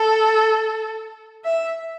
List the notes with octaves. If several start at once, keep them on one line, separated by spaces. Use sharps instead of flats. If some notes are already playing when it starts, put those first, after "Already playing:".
Already playing: A4
E5